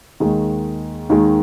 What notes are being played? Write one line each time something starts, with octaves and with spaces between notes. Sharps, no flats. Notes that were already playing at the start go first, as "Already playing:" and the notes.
D#2 D#3 G#3
D#2 D#3 G#3